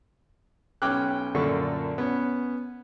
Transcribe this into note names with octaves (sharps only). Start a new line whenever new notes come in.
B1 C#4 G5 D6 F6 F#6
F#2 A#2 D3 D4 A4 C#6
B3 C#4